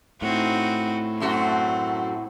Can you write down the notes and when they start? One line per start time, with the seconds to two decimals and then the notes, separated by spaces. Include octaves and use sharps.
0.22 A2 C4 D#4 F#4
1.20 F#2 A3 C4 F#4